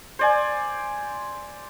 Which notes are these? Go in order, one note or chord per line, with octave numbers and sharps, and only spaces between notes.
C5 D5 G#5